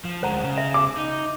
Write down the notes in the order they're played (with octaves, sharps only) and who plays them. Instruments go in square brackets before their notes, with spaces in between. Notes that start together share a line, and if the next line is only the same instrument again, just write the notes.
[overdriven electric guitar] F3
[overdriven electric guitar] D2 G#3 [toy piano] C5 F#5 A#5
[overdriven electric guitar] C#3
[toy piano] E5
[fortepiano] D6
[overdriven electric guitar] D#4